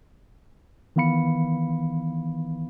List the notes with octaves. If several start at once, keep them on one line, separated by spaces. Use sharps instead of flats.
D#3 E3 B3 F5 B5 C#7